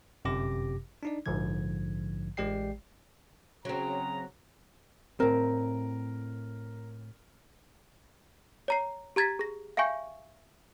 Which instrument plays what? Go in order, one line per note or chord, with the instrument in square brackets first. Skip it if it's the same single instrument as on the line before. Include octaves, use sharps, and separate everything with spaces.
[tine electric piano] G1 F#2 C3 G4 D6 A#6
D4 D#4 D5
A#1 G#2 D3 F3 G#6
A1 G#3 G4 D5 G5 C7
[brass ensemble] C#3 A#5 [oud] F#3 C4
[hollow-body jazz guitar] A2 C4 [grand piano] A#4
[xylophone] C#5 A#5 C7
G4 A#5 G#6 A6 B6
G#4 A#6
E5 F5 G5 G#5 C#6 G6